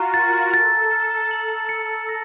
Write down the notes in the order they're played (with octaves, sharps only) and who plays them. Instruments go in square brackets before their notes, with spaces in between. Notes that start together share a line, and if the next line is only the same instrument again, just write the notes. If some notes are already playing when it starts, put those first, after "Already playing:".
Already playing: [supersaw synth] F4 F#4 [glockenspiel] A#5
[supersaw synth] A#4 [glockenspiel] A6
[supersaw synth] A4 [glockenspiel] A6
[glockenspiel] F6
F#7
C#7
A#6